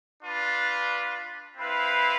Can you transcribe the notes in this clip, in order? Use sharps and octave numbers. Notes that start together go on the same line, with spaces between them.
D4 F4 B4
C4 E4 B4 F5